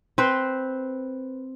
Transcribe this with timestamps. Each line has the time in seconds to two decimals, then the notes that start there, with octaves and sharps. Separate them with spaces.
0.18 C4 B4 C5